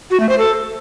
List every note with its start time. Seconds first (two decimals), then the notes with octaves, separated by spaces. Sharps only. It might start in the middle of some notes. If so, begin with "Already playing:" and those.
0.11 F#4
0.20 A3
0.29 C5
0.38 A4